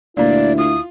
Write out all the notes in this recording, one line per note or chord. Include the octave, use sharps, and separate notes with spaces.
D2 A#2 A#3 E4 D5
F4 D#6